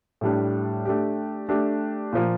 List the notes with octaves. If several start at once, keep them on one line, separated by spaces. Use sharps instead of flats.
A2 G3 D4
A3 D4 G4
A3 D4 G4
A#2 F3 A#3